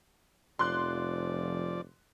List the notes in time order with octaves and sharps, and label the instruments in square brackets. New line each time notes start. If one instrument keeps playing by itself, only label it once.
[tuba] F1 [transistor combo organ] F3 D5 [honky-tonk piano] C6 F#6